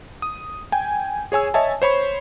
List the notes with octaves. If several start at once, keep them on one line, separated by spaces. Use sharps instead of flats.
D#6
G5 G#5
G#4 C#5 G#5 E6
C#5 D#5 E5 G#5 A5
C5 C#5 B5 C#6